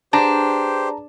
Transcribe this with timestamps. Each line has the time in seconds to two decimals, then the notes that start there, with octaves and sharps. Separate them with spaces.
0.13 D4 G4 G#4 B4 C5 D5 A5 A#5